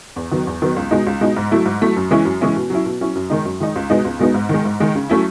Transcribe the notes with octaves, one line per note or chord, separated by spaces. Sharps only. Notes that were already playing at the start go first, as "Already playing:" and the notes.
E2
D#3 F#3 B3
E2
D#3 F#3 B3
C#2
B2 G#3 D#4
C#2
B2 G#3 D#4
G#2
F#3 A3 E4
G#2
F#3 A3 E4
F#2
E3 G#3 C#4 E4
F#2
E3 G#3 C#4 E4
B2
F#3 C#4 E4
B2
F#3 C#4 E4
F#2
D#3 G#3 D#4
F#2
D#3 G#3 D#4
C#2
B2 G#3 B3 D#4
C#2
B2 G#3 B3 D#4
G#2
D#3 G#3
G#2
D#3 G#3
C#3
F#3 A3 C#4 E4